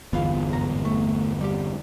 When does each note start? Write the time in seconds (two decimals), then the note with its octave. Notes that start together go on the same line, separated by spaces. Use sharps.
0.13 G1 E2 B3 F4 F5
0.49 B1 G#2 A#5
0.85 A3
1.41 G3 G4